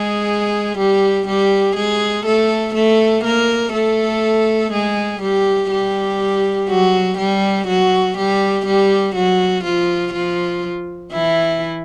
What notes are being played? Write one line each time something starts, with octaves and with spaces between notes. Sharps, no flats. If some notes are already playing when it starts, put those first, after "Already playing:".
Already playing: G#3 G#4
G3 G4
G3 G4
G#3 G#4
A3 A4
A3 A4
A#3 A#4
A3 A4
G#3 G#4
G3 G4
G3 G4
F#3 F#4
G3 G4
F#3 F#4
G3 G4
G3 G4
F#3 F#4
F3 F4
F3 F4
E3 E4